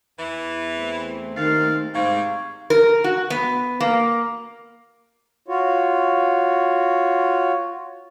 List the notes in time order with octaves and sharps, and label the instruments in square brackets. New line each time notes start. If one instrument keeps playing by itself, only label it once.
[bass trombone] E2 [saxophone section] E3
[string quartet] A3 C4
[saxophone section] D#2 F5 [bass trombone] D#3 [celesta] A6
[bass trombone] G#2 [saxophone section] C3 G3 [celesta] F5 C#6 G#6
[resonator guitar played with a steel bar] A#4
F#4
B3
A#3
[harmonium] F4 F#4 C#5